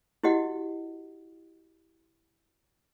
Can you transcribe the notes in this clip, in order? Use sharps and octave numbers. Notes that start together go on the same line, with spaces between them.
E4 F#4 G4 D#5 F#5